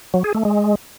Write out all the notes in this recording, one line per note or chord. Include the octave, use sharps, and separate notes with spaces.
F#3
G#4
A3
G#3